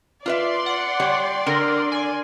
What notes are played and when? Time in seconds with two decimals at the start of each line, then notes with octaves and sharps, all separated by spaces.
0.26 F4 B4 D5 E5 C6
0.66 F#5
1.00 G3 G4 C#5
1.46 D3 A#4
1.92 G#5